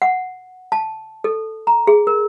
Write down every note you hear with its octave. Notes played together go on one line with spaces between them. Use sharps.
F#5
A5
A4
A#5
G#4
A#4